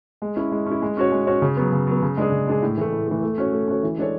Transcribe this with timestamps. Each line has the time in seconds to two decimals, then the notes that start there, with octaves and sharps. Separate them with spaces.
0.22 G#3
0.36 C#4 E4
0.52 G#3
0.66 C#4
0.71 E4
0.82 G#3
0.97 C#4 F#4 C#5
1.12 G#3
1.27 C#4 F#4 C#5
1.42 C#3
1.57 F#3 B3
1.72 C#3
1.87 F#3 B3
2.02 C#3
2.17 G#3 D4 G#4
2.32 C#3
2.47 G#3 D4 G#4
2.62 A2
2.77 E3 A3
2.92 A2
3.08 E3 A3
3.23 A3
3.38 C#4 F#4 C#5
3.52 A3
3.68 C#4 F#4 C#5
3.83 E3
3.98 G#3 D4 A4 C#5